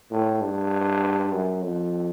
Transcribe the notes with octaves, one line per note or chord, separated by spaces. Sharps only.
A2
G2
F#2
F2